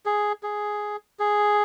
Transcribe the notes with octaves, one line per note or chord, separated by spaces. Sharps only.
G#4
G#4
G#4